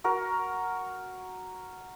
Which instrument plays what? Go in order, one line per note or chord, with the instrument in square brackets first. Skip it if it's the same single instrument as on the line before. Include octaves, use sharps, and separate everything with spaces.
[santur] F#4 A#4